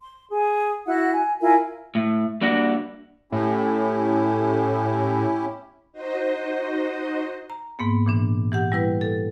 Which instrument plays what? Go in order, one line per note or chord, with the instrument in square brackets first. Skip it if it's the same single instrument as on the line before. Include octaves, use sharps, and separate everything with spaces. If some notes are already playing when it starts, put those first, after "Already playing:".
[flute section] C6
G#4
E4 F#4 F#5 F#6
G#5
E4 F4 A#4 G#5
[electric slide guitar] A2
G3 A#3 D4 F#4
[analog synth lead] A2 [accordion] C#4 E4 G4
[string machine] D#4 F#4 C5 D#5
[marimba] A#5
G#2 A#3 B3
A#2 E3 D4
E3 G4 F#5
G3 E4 B4
A4